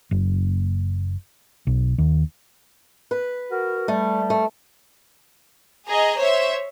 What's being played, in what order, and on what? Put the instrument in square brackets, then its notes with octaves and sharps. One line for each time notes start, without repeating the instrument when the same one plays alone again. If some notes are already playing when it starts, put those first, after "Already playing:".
[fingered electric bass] F#1
B1
D#2
[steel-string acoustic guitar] B4
[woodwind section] F#4 A#4
[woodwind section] G3 [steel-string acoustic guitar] A3
[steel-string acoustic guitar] A3
[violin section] G#4 D#5 A#5
C5 C#5 E5